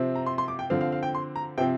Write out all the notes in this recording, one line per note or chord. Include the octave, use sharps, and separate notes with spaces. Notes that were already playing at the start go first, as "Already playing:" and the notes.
Already playing: C3 F3 C4
A#5
C6
C6
D6
G5
D3 F3 C4 F5
F5
F5
G5
C6
A#5
C3 F3 C4 G5